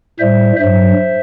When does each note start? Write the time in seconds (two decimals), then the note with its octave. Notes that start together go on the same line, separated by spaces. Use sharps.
0.20 A2 G3 C5 E5
0.60 G2 F#3 C5 E5